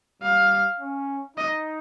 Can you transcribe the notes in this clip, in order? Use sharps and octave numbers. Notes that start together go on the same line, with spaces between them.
G3 F5
C#4
D#4 D#5